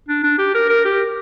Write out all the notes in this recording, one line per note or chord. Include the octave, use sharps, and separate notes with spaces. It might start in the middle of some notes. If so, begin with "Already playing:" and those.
D4
D4
G4
A#4
A#4
G4